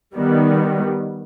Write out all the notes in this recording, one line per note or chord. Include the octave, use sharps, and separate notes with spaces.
D#3 G3 B3